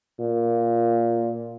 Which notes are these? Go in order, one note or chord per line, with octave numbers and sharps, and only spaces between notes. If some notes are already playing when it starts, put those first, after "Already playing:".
A#2